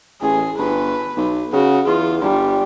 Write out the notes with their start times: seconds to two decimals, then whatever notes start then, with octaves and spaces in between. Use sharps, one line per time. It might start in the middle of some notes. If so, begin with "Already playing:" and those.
0.21 A1 G#4
0.59 G1 B4
1.17 B1
1.53 C#3 F#4
1.87 E2 F4
2.22 G1 G3